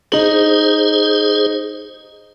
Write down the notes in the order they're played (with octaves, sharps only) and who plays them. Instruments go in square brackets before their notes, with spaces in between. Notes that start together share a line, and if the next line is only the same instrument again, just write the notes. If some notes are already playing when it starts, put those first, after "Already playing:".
[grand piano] D#4 F#7 [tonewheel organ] G#4 C5